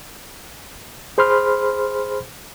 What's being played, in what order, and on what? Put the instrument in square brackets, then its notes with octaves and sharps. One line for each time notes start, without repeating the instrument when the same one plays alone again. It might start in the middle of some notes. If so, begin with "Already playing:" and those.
[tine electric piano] G#4 C5 B5 C6 F6